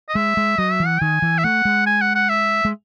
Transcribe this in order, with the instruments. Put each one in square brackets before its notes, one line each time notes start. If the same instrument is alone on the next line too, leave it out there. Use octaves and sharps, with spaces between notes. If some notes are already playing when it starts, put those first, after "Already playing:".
[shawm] D#5
[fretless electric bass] G#3 [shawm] E5
[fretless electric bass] G#3
[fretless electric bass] F#3 [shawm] D#5
[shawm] E5
[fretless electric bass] E3
[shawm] F#5
[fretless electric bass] D#3 [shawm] G#5
[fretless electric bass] E3
[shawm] E5
[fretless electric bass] A3 [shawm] F#5
[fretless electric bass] G#3
[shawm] G#5
F#5
F#5
E5
[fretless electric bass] G#3